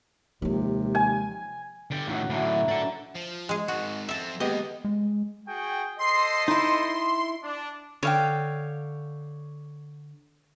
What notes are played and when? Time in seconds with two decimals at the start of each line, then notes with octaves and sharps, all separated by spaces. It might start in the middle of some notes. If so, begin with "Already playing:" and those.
0.42 D#2 C3 F3 G#3
0.95 G#5
1.91 D3 G4
2.07 F#2 A2 D#3 F#4
2.30 A2 D3 E3 F#3 A3
2.68 D4 A4
3.15 F3
3.49 G#3 G#4
3.68 G#2 D#3 F#4
4.09 F3 C4 A4 E5
4.40 D#2 G#3 B3 G4 D#5
4.85 G#3
5.47 F#4 G#4 G5
5.98 A4 C5 D#5 C6 C7
6.48 D#4 E4 C6
7.43 D4
8.03 D3 C#5 F5 G5